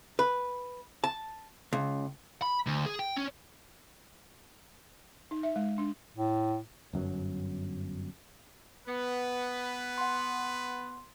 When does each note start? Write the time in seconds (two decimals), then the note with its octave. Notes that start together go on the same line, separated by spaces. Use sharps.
0.19 B4
1.04 A5
1.73 C#2
2.42 B5
2.67 D2
2.86 G#4
2.99 G5
3.16 C#4
5.31 D#4
5.43 E5
5.56 G#3
5.78 D4
6.17 A2
6.93 G1 F#2 F#3
8.88 B3 B4
9.98 F#5 C6